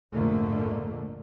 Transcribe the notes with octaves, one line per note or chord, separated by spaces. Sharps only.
A#1 F2 G#2 D3 A3 A#3